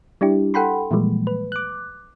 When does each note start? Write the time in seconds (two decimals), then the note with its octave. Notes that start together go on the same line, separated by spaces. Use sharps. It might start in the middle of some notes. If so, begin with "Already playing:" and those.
0.21 G3 D4 E4 G4
0.54 A4 F#5 G5 B5 C6
0.91 A#2 E3 F3 G3 G#3 A#3
1.27 B4
1.52 D6 F#6